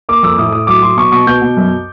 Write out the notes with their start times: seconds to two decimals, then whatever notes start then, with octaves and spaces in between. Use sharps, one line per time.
0.09 A#3 D6
0.23 F2 E6
0.38 A2 D#6
0.52 A2 D#6
0.67 F#3 D6
0.82 F#3 C6
0.97 B2 C#6
1.12 B2 C#6
1.27 B2 G6
1.42 B2
1.57 F#2